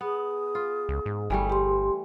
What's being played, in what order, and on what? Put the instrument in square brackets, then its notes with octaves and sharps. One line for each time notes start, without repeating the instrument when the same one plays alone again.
[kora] B3 [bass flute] G#4
[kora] F4
[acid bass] C#2
G#2
[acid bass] G1 [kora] E3 G3 A3
[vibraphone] G4 C6